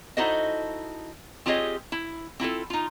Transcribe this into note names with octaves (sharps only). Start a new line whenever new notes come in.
D#4 E4 F#4 A4 C5 D#5
C4 F4 G4 G#4 C#5 D#5
E4
C4 E4 F4 A4
D#4 F4